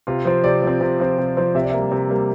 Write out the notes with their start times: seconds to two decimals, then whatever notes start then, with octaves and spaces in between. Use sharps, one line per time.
0.07 C3 F4
0.25 F3 C4
0.44 C3 D5
0.62 F3
0.67 C4
0.81 C3
1.00 F3 C4
1.18 C3
1.37 F3 C4
1.55 C3 E5
1.63 D5
1.70 A#3 E5
1.78 G3
1.92 C3
2.10 G3 A#3